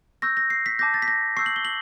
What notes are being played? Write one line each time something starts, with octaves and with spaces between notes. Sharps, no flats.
C#6 E6 G6 A#6
A#6
C7
B6
A5 D6 G6 A#6
A6
B6
A#6
C#6 E6 G6 C7
F#7
G7
F#7